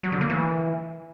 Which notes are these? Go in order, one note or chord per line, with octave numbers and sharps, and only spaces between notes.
F#3
D3
A#3
E3